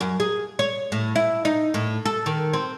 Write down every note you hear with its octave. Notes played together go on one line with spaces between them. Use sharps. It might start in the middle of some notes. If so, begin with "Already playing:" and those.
F#2
G#4
C#5
A2
E4
D#4
A2
A4
D#3
C4